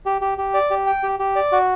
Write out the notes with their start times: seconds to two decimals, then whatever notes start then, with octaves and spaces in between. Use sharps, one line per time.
0.06 G4
0.21 G4
0.38 G4
0.54 D5
0.71 G4
0.87 G5
1.03 G4
1.19 G4
1.36 D5
1.52 F#4